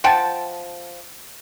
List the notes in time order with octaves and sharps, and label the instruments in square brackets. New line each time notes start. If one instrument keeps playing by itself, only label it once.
[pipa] F3 F#5 G5 A5